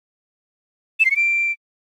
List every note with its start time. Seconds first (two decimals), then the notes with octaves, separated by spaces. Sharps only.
1.00 E7
1.05 C7
1.11 C#7
1.16 D7